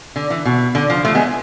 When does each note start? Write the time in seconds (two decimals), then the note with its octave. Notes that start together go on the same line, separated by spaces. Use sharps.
0.16 D3
0.30 E3
0.45 B2
0.75 D3
0.90 F3
1.05 F3 A3
1.14 G#3 B3